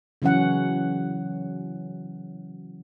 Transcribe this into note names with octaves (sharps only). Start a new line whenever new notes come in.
C#3 E3 F#3 C#4 F#5